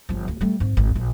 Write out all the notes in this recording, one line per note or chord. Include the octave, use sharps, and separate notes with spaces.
G1 F3
D2
G3 A3
G#2 C4
G#1
A#1